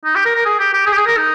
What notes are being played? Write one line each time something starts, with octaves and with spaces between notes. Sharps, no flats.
D#4
G4
A#4
A#4
G#4
G4
G4
G#4
G4
G#4
A#4
D#4